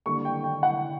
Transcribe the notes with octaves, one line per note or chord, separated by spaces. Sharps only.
D3 G3 A#3 C#6
G5
G5
F#5